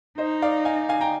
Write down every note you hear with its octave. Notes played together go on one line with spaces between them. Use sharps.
D#4 C5 D#5
D5 F5
F5 G#5
F5 G#5
G5 A#5